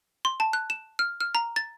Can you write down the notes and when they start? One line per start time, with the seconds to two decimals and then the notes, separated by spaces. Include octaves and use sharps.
0.25 C6
0.40 A5
0.53 F#6
0.70 E7
0.99 F6
1.21 F6
1.35 A#5
1.56 A6